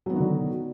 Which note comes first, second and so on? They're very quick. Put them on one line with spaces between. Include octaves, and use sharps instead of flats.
F#3 B3 D#3 F#4 D3